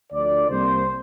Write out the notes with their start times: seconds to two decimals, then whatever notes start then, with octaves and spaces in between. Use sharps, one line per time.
0.12 D2 D3 F3 D5
0.49 C2 C3 G3 A#3 C5